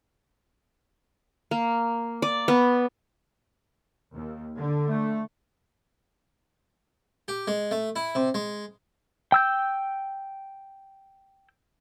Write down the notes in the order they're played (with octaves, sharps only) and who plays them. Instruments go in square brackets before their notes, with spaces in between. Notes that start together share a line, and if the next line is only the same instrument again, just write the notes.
[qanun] A#3
D5
B3
[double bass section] D#2
D3
[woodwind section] A3
[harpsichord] G4
G#3
A3
E4
C3
G#3
[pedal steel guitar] G5 E6 G6